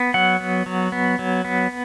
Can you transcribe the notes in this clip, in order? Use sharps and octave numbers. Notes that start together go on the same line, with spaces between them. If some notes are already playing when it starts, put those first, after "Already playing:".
Already playing: B3
F#3 F#5
B3
F#3
B3
F#3
B3